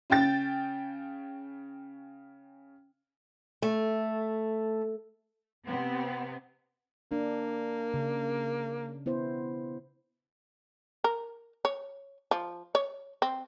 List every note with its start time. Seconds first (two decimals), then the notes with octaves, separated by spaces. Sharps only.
0.10 C#3 C#4 G5 A6
3.62 A3
5.64 C3 B3 C4
7.12 A#3 D4
7.94 C#3
9.06 B3 E4 C5
11.04 A#4
11.65 C#5
12.31 F3
12.75 C#5
13.22 C4